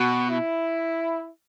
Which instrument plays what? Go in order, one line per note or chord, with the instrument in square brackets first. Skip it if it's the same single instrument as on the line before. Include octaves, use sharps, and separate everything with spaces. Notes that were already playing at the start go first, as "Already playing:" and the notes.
Already playing: [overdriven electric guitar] B2 [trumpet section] F#4
[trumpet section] E4